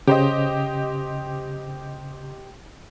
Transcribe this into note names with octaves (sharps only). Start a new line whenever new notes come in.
C#3 G4 C5 D#5